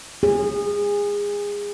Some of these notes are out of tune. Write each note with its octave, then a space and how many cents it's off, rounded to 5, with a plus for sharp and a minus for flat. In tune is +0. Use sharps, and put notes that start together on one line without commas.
G#4 -25